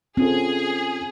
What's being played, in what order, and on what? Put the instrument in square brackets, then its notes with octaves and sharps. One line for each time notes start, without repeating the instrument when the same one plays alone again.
[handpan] C4 [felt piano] C#4 F4 A4 [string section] G#4